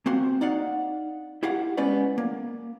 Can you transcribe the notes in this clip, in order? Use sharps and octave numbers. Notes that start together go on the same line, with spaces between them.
A#3 C4 F#4 C5
D#4 D5 F5 F#5
E4 G4 F5 F#5
G#3 B3 C#4 B4 C5 D5
A#3